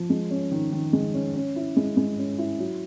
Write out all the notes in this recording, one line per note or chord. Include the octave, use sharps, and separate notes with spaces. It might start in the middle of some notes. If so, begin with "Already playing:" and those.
Already playing: F3
G#3
C#4
D#3
D#3
G#3
C#4
C#4
E4
G#3
G#3
C#4
E4
F#3